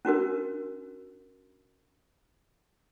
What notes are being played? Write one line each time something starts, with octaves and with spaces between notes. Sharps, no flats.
C#4 D4 F#4 A#4